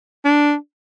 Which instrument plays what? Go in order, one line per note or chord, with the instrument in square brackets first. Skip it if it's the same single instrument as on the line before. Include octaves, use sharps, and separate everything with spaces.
[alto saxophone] D4